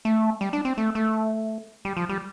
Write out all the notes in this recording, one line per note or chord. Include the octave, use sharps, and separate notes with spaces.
A3
G3
D4
C4
A3
A3
G3
F3
G3